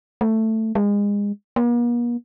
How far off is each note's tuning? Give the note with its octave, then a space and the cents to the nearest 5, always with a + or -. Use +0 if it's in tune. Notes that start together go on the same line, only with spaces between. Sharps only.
A3 +10
G#3 -30
A#3 +45